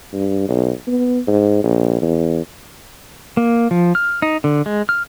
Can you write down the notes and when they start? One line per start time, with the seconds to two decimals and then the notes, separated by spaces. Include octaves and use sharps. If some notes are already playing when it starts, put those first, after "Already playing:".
0.13 G2
0.49 B1
0.87 B3
1.27 G#2
1.63 A#1
2.02 E2
3.37 A#3
3.71 F3
3.95 F6
4.22 D#4
4.44 D3
4.66 G#3
4.89 F6